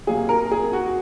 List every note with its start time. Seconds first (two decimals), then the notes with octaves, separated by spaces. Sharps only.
0.07 C3 F#3 A#3 G#4
0.29 A#4
0.51 G#4
0.73 F#4